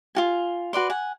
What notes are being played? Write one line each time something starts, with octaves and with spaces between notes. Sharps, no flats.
F4 F#4 G#5
F#4 B4 D5 C6
F#5 G#5